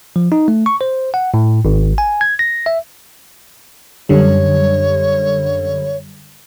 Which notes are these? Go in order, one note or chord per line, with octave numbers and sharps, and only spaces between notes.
F3
D#4
A3
C#6
C5
F#5
A2
G#1
G#5
G#6
A#6
E5
F#2 D3 G3 C#5